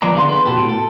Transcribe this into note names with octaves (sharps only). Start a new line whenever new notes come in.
E3 F3 B3 D5 A#5
D3 G#4 F5 C6
B3 B4
B2 F#4 G4 A4
A2
A4